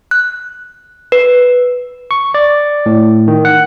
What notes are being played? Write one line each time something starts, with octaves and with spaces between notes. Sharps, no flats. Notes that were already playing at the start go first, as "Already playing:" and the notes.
F#6
B4
C#6
D5
A2
D#3
F#5